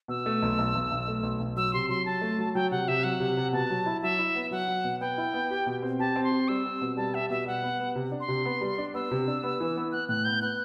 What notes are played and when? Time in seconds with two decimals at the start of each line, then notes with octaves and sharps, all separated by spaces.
0.08 B2 E6
0.26 A3
0.42 B1
0.58 B1
0.75 B1
0.92 B1
1.08 A3
1.23 B1
1.39 B1
1.56 F#3 E6
1.73 C3 C6
1.89 F#3 C6
2.06 F#3 A5
2.21 A3
2.39 F#3
2.55 F#3 G5
2.71 C3 F#5
2.88 C3 E5
3.04 F#3 F#5
3.20 C3
3.37 C3
3.53 B2 A5
3.70 F#3
3.86 E4
4.02 F#3 E5
4.19 E4
4.35 B3
4.51 F#3 F#5
4.68 F#3
4.84 B2
5.01 B3 G5
5.18 E4
5.34 B3
5.51 G4
5.66 B2
5.82 C4
5.99 G4 A5
6.16 C4
6.24 C6
6.31 G4
6.48 G3 E6
6.65 C4
6.81 B2
6.97 G3 A5
7.14 G4 E5
7.30 B2 E5
7.46 G3 F#5
7.63 B3
7.80 B3
7.95 C3
8.12 D4
8.20 C6
8.28 C3
8.45 B3
8.61 G3
8.78 D4
8.94 B3 E6
9.11 C3
9.28 D4
9.43 B3
9.60 E3
9.77 B3
9.92 B3 F#6
10.09 A2 F#6
10.25 B3 G6
10.42 B3 F#6